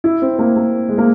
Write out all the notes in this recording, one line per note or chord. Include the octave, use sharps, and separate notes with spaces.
E4
C4
A#3
A#3
G#3
A#3